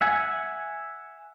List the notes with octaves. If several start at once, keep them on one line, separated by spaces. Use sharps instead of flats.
E5 F#5 G#5